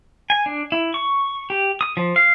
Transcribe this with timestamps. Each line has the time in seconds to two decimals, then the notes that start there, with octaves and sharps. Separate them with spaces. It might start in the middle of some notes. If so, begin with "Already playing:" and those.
0.30 G#5
0.46 D4
0.72 E4
0.94 C#6
1.50 G4
1.81 D#6
1.97 F3
2.16 F5